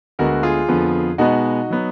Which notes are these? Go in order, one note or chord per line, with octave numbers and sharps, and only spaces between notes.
D2 D3 G#3 B3 F#4 A#4
F4 G#4
F2 D3 F3 B3
B2 G#3 B3 D#4 F#4
F#3 B3